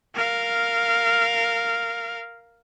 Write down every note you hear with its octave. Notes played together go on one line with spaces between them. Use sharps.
A#4 F5